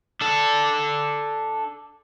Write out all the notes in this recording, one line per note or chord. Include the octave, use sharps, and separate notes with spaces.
D4 A4